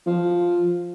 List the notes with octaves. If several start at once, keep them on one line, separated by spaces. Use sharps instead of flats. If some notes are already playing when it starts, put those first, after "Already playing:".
F3